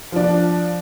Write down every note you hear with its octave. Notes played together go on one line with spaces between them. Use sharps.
F3 D4